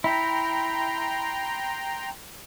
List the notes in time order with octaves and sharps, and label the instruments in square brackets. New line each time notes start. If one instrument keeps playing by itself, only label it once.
[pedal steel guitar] E4 [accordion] G5 A#5 C6